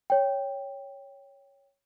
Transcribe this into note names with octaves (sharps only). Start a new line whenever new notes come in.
C#5 G5